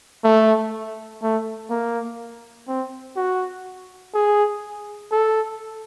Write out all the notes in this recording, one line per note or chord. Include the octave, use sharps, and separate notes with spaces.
A3
A3
A#3
C4
F#4
G#4
A4